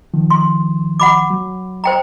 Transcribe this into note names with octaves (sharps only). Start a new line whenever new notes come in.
D#3 F3
C6
F#5 B5 D6
F#3
C5 G5 A#5